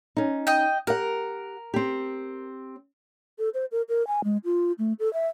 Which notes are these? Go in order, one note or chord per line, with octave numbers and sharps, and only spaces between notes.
C#4 D#4
D#5 G5
G4 A#4 F#5
C4 G4
A4
C5
A#4
A#4
G#5
G#3
F4
A3
A4
E5